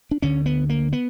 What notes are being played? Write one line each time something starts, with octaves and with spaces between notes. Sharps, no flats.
D4
D2 D3 C#4
B3
A#3
B3